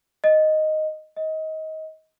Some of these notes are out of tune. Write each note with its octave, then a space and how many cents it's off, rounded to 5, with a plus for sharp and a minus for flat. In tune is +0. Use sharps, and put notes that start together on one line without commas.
D#5 +0
D#5 +25